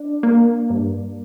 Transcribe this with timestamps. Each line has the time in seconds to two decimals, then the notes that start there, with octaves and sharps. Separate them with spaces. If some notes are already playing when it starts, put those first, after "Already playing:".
Already playing: D4
0.23 A#3
0.70 G2